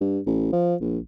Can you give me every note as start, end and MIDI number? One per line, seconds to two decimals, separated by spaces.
0.01 0.19 43
0.26 0.52 33
0.52 0.75 53
0.81 0.98 34